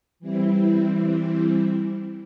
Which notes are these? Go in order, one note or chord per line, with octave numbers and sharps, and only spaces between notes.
E3 G3 C4 E4